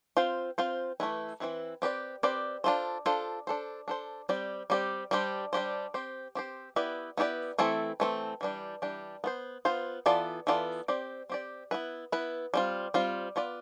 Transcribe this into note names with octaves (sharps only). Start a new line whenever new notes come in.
C4 F4 C5
C4 F4 C5
E3 A3 C4 E4 B4
E3 A3 C4 E4 B4
C4 G4 B4 D5
C4 G4 B4 D5
D4 F4 A4 C5
D4 F4 A4 C5
D4 A4 C5
D4 A4 C5
G3 C4 G4 D5
G3 C4 G4 D5
G3 D4 G4 C5
G3 D4 G4 C5
C4 G4 C5
C4 G4 C5
B3 E4 G4 B4 D5
B3 E4 G4 B4 D5
E3 A3 C4 E4 A4
E3 A3 C4 E4 A4
E3 G3 D4 G4
E3 G3 D4 G4
B3 F4 C5
B3 F4 C5
E3 B3 F4 A4 D5
E3 B3 F4 A4 D5
C4 G4 D5
C4 G4 D5
B3 E4 B4
B3 E4 B4
G3 C4 F4
G3 C4 F4
B3 F4 B4 D5